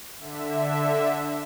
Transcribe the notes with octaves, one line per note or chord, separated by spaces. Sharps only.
D3 E5